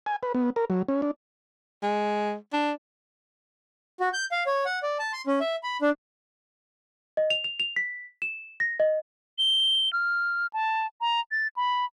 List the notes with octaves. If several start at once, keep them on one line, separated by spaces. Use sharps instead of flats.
G#5
B4
B3
A#4
F#3
C#4
D4
G#3
D4
F#4
G6
F5
C#5
F#5
D5
A5
C6
C#4
E5
B5
D4
D#5
F7
F7
F7
B6
E7
A#6
D#5
G7
F6
A5
A#5
A6
B5